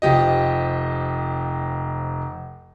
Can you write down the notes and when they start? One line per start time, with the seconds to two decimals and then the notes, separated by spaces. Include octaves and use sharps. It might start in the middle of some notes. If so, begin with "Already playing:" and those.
0.02 F1 F3 G4 D#5